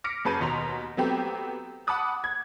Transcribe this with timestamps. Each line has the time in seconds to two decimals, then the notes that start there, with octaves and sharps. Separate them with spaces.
0.04 D6 F6 A#6 B6 C#7 D7
0.25 F#2 G#4 B4 A5 G6 D#7
0.40 D#2 B2 A#5 C6 F7
0.97 F#3 A3 B3 C4 G4
1.87 F#5 A5 B5 D6 D#6 F#6
2.24 G#6